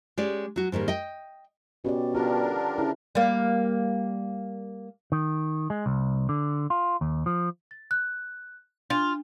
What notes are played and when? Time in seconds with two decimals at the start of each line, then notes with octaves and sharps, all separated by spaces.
0.18 G#3 C#4 G4 D5
0.56 F#3 F#4
0.72 G#2 D#3 G3 A#3
0.88 D#5 G5
1.85 B2 C#4 G4 D5
2.15 D3 D4 F4 G4 A#4 B4
2.78 C#3 E4
3.15 G3 A#3
5.12 D#3
5.70 G#3
5.86 C2
6.29 D3
6.70 F4
7.01 D#2
7.26 F3
7.71 A6
7.91 F#6
8.90 D4 F4